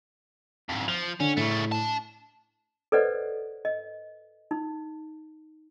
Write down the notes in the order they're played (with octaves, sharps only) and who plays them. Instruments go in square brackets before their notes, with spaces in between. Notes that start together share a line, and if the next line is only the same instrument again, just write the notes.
[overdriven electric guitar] F2 G#2
[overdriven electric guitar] F3 [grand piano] F7
[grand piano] D3 [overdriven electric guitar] C#4
[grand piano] A2 [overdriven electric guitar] C#3 A3
[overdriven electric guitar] D4 A5
[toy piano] A4 B4 C5 D5 D#5 F#5
D#5
D#4